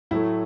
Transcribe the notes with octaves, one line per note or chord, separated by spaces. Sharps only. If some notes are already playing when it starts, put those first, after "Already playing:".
A2 F#3 A3 E4